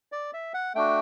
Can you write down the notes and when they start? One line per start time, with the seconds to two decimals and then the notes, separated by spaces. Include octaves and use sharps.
0.12 D5
0.34 E5
0.54 F#5
0.75 A3 D4 F#4 G5